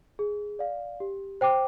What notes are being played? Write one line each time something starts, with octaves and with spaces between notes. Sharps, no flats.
G#4
D5 F5
G4
C5 G5 D6